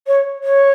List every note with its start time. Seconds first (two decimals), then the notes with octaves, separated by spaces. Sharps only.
0.07 C#5
0.44 C#5